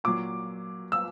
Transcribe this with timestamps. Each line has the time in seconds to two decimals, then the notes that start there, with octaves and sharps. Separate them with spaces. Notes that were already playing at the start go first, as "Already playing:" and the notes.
0.04 A#2 F#3 D6
0.92 E6